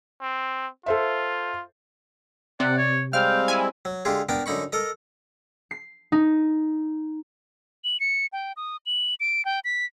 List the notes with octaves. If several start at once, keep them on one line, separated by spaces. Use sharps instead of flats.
C4
F4 A4 C5 E5
C3 D5 F#5
C#5
G3 G#3 C4 F5 G5 F6
E4 G#5
F#3
D3 G#3 F4 G4 G#4
B3 D4 A#4 G5 A5
F#2 D3 D#4 B5 C#6
A4 A#4 D#5
C7
D#4
F#7
C#7
G5
D#6
F#7
D7
G5
B6